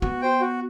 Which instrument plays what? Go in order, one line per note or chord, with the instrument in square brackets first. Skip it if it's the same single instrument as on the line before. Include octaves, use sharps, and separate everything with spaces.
[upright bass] B3 [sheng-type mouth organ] F#4
[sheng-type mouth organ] C5 G5
F#4